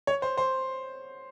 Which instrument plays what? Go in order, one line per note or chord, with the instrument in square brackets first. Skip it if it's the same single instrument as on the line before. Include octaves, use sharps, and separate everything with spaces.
[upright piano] C#5
C5
C5